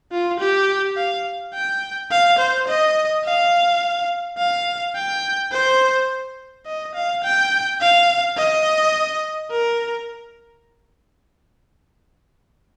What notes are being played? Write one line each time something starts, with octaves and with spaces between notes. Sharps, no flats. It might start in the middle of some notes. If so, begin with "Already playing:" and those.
F4
G4
F5
G5
F5
C5
D#5
F5
F5
G5
C5
D#5
F5
G5
F5
D#5
A#4